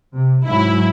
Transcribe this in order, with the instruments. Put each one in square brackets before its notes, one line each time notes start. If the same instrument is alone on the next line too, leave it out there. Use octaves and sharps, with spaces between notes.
[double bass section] C3
[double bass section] G#2 F#3 [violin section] E4